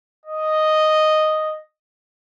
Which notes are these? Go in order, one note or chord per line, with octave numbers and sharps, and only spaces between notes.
D#5